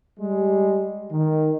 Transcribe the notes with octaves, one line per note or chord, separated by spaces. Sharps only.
G3 G#3
D#3